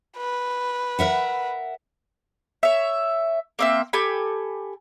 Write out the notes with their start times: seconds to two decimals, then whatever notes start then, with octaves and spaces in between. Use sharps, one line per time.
0.17 B4
0.99 A#4 E5 F#5
2.63 C#5 E5
3.59 A#3 C4 E5
3.93 G4 A4 G#5 B5